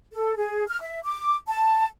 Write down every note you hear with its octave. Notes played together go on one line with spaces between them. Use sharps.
A4
G#4
F6
E5
D6
A5